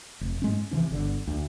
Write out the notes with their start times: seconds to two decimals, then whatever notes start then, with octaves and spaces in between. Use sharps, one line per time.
0.21 F1
0.42 G#2 G#3 C#4
0.71 C3 E3 F3 D4
0.90 G1 D3
1.27 D2